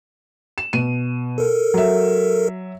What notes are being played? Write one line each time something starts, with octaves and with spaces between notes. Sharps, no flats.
E7
B2 D#7
A4 A#4
F#3 E5